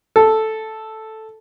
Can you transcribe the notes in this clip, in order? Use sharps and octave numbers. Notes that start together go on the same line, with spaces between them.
A4